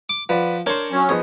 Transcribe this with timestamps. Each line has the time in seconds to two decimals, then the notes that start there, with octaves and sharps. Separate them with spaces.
0.09 D6
0.29 F3 B4 D5 F#5
0.66 D4 A#4 C5 C#5
0.91 F#3 C#4
1.09 F3 B3 D#4 G#4